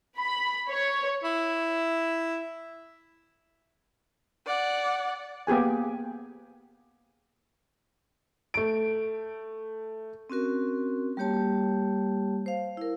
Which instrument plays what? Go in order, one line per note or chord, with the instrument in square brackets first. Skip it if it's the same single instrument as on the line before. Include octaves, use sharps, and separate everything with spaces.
[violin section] B5
C#5
[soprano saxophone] E4
[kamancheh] D5 F#5
[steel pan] A#3 B3 G4 G#4 G#5
[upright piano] A3 D7
[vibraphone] C4 C#4 F#4 A#4
G3 A#3 G4 C#5 A5
C5 F5
E4 A#4